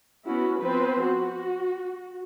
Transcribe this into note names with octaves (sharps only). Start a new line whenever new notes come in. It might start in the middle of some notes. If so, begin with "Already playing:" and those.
B3 C#4 E4 F#4
F3 B3 C4 B4 C5
F#4